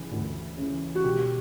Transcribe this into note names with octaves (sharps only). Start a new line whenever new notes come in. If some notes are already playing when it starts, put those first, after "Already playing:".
Already playing: C#3 E3
D2
C#3 E3
F#4
E1 G4